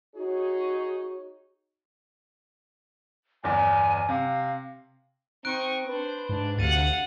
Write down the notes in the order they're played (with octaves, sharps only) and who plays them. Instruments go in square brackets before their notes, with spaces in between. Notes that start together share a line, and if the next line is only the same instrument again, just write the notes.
[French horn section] D#4 G#4 C#5 [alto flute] F#4
[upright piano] G1 E2 [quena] G#5
[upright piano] C3 [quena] F5
[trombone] C4 [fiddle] D#4 C#6 [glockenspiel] F#6 D7
[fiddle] D4 C5 [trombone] B4
[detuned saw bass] G#2 [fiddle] D4
[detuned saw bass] D2 [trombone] C3 [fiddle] F5 F#5 [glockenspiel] A6 D#7